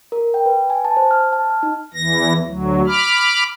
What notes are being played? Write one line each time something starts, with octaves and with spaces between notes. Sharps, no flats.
A#4
G5
B4
G#5
A5
C5
F6
A5
F6
D#4
E2 E3 A#6
D2 F#3
B5 D6 F6